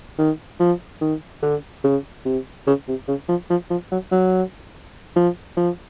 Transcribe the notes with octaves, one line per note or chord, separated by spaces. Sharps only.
D#3
F3
D#3
D3
C#3
C3
C#3
C3
C#3
F3
F3
F3
F#3
F#3
F3
F3